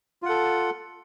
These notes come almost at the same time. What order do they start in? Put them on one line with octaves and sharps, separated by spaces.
F4 F#5 A4